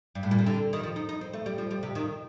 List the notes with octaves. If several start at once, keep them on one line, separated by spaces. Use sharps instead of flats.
G2
A2
A#2
C3
D3
D#3
F3
D#4
D#4
C4
A3
G3
F3
G3
C3
D#3